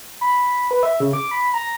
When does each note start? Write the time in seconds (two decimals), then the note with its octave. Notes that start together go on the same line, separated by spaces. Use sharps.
0.21 B5
0.71 B4
0.83 E5
1.00 C#3
1.13 D6
1.31 B5
1.54 A#5